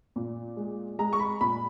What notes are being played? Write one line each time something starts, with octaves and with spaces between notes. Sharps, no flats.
A#2
G#3
G#3 A#5
C#6
B5
A#2 B5